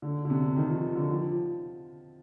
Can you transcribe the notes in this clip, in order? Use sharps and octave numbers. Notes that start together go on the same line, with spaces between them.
D3
D3
C3
D#3
F3
D3
F3